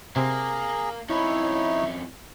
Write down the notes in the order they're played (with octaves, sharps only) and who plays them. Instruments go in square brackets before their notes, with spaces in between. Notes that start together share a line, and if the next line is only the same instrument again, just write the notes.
[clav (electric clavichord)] C3 C4 [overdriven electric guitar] A#3 [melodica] G#4 A#5
[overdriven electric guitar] F2 C#4 [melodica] D#4 C#5 [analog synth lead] E4